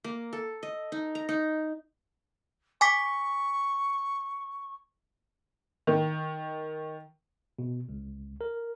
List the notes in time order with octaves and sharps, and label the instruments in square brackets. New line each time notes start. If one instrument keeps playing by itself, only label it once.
[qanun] A#3
A4
D#5
D#4
A#5
D#4
[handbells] G#5 D6 B6 [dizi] C#6
[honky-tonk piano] D#3
[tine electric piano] B2
C#2
A#4